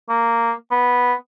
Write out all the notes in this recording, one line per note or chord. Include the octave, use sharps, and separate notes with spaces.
A#3
B3